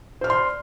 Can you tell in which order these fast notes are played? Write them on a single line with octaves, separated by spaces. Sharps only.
C5 F6 D5 C6